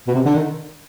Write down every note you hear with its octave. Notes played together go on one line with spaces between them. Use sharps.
B2
C3
D3
D#3